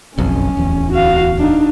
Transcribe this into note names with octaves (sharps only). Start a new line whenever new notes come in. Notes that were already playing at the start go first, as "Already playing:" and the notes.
F#1 B1 F2 C#4
D1 E2
F#4 F5
D4 D#4